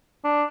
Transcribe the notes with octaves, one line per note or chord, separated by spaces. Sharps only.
D4